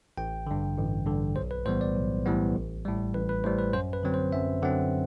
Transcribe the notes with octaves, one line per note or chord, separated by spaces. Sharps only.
A1 G5
G2 D3
A1
G2 D3
B1 C5
B4
A2 E3 G3 B3 C5
D5
B1
A2 E3 G3 B3
A1
A2 G3
A1 B4
B4
A2 G3 C5
B4
F#2 C5
B4
D3 F#3 C4
C5
F#2 E5
D3 F#3 C4 F#5